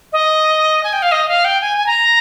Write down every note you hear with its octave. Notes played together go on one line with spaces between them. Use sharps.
D#5
G#5
G5
F5
D#5
F5
G5
G#5
G#5
A#5